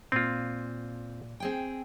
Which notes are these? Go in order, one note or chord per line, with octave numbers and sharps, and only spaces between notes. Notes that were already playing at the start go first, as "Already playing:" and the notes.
A#2 C4 F4
C4 G#4 G5